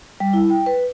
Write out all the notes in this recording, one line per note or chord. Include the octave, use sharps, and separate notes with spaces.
G3
E4
G5
B4